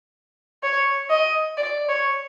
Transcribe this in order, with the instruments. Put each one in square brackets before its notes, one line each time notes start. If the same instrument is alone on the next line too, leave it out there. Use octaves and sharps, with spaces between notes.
[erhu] C#5
D#5
D5
C#5